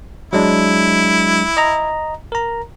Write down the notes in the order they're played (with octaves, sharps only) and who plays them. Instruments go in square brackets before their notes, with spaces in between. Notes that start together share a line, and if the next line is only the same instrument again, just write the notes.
[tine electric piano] F#3 G#3 D4 [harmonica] E4
[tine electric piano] D#5 A#5
A#4 A#5